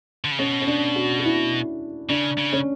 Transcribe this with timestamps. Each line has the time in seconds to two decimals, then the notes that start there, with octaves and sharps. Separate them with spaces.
0.24 D3
0.32 C#3
0.39 B2 C#4
0.61 C#4
0.67 D4
0.96 F#4
1.19 F#4
1.25 E4
2.09 C#3 D4
2.38 C#3
2.53 C#4